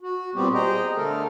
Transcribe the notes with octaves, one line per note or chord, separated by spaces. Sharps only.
F#4
A#2 G3 B3 C4 G4
G#4 C5 D#5 G5 A#5
D3 A3 A4 A#4